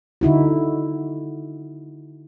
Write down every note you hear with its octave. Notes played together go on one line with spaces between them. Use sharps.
D3 D#4 E4 F#4